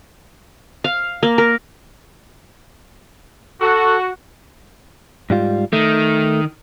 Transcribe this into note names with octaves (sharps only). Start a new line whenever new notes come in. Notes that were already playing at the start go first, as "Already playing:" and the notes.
F5
A#3
A#4
F#4 A4
G#2 G3 F4
D#3 A3